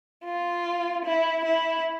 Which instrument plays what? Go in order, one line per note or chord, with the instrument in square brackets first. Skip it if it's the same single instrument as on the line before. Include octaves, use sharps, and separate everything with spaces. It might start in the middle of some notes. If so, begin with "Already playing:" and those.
[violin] F4
E4
E4